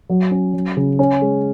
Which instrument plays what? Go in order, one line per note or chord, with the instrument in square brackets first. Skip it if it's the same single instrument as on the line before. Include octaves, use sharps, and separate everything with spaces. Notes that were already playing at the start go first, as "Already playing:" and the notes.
[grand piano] F#3
C#4
F#3
C#3
C#4
G#3